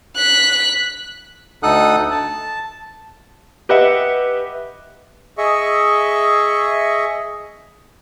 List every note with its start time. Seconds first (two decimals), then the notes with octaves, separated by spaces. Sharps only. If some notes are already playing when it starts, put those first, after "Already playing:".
0.17 F#6 B6
1.63 D2 D#4 A4 F#5 D#6 F#6
2.11 A5
3.69 G4 B4 D#5 E5 F#5
5.38 G#4 D#5 E5 C#6